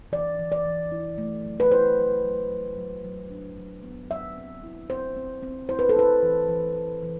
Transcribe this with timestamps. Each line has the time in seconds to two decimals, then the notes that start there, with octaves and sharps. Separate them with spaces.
0.12 E3 D5
0.39 E3
0.52 D5
0.65 E3
0.92 E4
1.18 A3
1.45 F#3
1.60 B4
1.71 E4 C5
1.98 F#3
2.24 F#3
2.51 F#3
2.77 F#3
3.04 F#3
3.30 D4
3.57 F#3
3.83 B3
4.11 F#3 E5
4.37 C4
4.63 E4
4.90 C4 C5
5.17 C4
5.43 C4
5.69 E4 C5
5.79 B4
5.89 A4
5.97 E4 B4
6.23 E3
6.49 E3
6.75 E3
7.03 E3